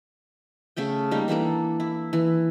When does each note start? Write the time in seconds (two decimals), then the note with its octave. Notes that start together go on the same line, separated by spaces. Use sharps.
0.77 C#3 A3 A4 G5
1.11 G3 A#3 D#4
1.28 E3 A#3 D4 A4
1.80 E4
2.13 E3